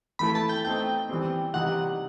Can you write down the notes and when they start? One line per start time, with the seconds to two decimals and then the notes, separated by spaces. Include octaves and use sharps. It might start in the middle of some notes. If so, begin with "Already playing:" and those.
0.19 E3 A3 E4 A4 B5
0.35 A5
0.49 G5
0.65 A3 C4 D#4 G5
1.09 E3 G3 C4
1.54 C3 E3 G3 D#4 F#5